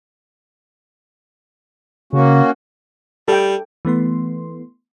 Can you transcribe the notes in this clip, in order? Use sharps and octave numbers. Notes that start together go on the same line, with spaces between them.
C#3 A#3 C#4 F#4
G3 A4 G5
E3 A3 B3 C6